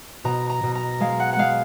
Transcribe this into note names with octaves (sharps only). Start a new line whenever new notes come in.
B2 A#5
A#5
B2
A#5
G#3 F5
F#5
F#5
G#3 F5